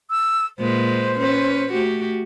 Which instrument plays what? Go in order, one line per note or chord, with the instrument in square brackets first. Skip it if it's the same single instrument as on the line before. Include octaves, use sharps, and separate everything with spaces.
[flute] E6
[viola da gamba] A#2 G#3 B4 [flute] C5
[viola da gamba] C#4 B4
A3 F#4 G4